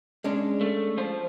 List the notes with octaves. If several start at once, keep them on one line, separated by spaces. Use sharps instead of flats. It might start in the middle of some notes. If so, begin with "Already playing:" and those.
G#3 C#4 D4
A3
F3 C5